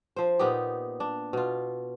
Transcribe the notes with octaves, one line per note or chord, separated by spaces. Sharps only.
F3 C5
A#2 B3 D#4 G4
D4
B2 F4